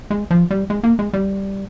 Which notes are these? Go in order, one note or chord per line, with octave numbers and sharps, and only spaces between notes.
G#3
F3
G3
G#3
A#3
G#3
G3